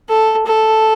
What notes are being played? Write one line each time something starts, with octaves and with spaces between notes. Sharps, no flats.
A4
A4